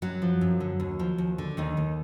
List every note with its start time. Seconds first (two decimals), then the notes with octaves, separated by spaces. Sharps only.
0.02 F#2 F#3 F#4
0.22 F3
0.41 F#2
0.60 D3
0.80 D#2
0.99 F3
1.18 D#2
1.38 D3
1.57 D#2 D#3 D#4
1.77 D#2